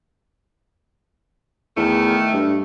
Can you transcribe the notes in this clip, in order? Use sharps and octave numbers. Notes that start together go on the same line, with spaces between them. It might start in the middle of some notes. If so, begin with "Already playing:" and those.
E2 D#3 A3
G2